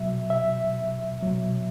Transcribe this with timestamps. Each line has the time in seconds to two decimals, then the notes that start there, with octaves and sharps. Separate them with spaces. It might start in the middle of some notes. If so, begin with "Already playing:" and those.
Already playing: B2 F#3 E5
0.30 E5
1.23 B2 F#3